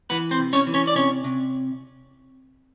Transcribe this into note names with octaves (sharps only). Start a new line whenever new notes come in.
E3 B3 B4
C4 C5
C3
C#4 C#5
E3
C#4 C#5
D5
C3 C#4 C#5
C3